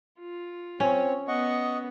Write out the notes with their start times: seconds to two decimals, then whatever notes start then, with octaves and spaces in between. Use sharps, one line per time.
0.20 F4
0.80 C4 C#4 C#5
1.28 B3 D#5 F#5 C#6